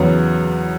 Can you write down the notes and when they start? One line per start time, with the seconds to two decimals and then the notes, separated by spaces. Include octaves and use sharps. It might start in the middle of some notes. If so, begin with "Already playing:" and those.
Already playing: E2 C#3 F#3 B3